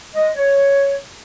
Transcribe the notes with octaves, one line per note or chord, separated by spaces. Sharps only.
G#3 D#5
C#5